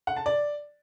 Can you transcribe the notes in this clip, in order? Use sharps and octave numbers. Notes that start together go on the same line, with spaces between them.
F#5
A5
D5